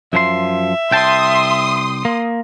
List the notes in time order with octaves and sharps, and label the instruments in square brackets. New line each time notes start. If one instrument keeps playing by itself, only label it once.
[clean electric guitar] F#2 F3 C6 [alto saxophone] E5
[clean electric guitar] C2 G5 A5 [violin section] C6 D#6
[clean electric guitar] A#3